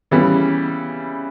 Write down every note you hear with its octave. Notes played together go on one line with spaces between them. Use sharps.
C#3 E3 G3 B3